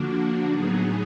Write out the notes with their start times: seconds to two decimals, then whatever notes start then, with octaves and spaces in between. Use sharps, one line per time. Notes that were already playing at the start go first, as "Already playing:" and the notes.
Already playing: D3 F3 A#3 D4 F#4
0.49 A2 F#3 B3 D#4 G#4